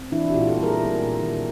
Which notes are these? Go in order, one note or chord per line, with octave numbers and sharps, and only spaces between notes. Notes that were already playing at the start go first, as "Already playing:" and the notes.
Already playing: C4
E3 D4 E4
F#4
A#2 F4 G4
G4 A4
G3
G#4 A#4
B3
A#2
D#3